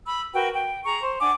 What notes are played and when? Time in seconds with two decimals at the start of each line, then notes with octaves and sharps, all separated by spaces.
0.06 B5 E6
0.34 F#4 A#4 B4 G5
0.54 G5
0.85 G#4 A#5 C#6
1.02 C5
1.20 D4 F#5 G#5 D6